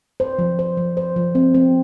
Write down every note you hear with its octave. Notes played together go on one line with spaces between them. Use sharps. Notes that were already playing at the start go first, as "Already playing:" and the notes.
C5
F3
C5
F3
C5
F3
C4
C4